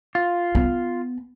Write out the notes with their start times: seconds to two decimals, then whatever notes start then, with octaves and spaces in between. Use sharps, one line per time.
0.15 F4
0.55 B3